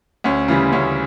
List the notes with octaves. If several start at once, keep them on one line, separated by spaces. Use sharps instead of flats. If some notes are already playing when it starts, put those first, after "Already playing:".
D2 C#4
C#3 E3 G3
D2 C#4